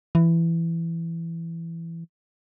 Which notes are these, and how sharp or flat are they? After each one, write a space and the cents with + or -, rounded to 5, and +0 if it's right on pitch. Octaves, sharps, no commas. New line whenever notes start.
E3 +15